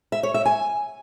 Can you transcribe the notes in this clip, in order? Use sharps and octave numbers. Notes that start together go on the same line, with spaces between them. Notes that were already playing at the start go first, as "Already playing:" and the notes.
E5
C#5
E5
G#5